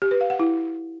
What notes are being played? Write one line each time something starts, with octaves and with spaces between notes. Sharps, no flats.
G4
B4
F5
F#5
E4